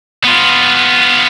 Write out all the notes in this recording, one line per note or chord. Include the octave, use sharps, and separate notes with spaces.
B3 F4